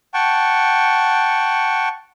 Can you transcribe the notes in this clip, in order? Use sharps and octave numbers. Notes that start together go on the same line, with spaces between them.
F#5 G5 A5 C#6